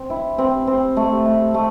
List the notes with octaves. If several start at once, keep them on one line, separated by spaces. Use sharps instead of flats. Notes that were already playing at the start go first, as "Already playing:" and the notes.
Already playing: C4
E4
C4
C4
A3
A3
A3